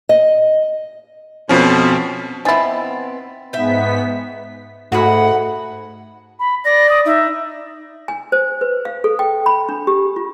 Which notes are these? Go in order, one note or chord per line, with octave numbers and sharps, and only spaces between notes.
D#5
F2 B2 F3 C#4
B3 C4 D#4 E4 G#5 A6
G#2 B3 E5 G5 B6
G#2 A3 F#4 G#4 F#5 B5
B5
D5 A#6
D#6
D#4 E5
G#5
C5
B4
F5
A4
G5
B5
D4
G4
F4